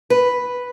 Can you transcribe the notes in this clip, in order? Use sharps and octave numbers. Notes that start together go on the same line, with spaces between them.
B4